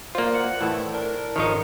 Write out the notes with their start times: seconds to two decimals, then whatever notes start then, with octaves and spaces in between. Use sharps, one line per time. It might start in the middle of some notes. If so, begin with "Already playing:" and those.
0.15 A#3 F4 C5 D5
0.34 F#5
0.61 A2 D#3 E3 E4
0.92 D4 A#4
1.36 G#1 F2 D#3 F3 D#4 A#4 C#5